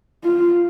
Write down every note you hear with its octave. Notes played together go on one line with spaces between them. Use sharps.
F4